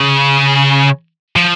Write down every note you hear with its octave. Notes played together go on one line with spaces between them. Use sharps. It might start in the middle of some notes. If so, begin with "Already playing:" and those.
Already playing: C#3
F3